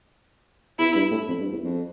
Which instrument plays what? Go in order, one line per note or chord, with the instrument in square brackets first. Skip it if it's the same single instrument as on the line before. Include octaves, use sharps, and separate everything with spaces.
[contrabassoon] E2 [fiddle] E4
[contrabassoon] G2
A2
F2
G2
E2
F2